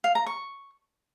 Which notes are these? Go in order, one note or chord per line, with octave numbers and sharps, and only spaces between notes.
F5
A#5
C#6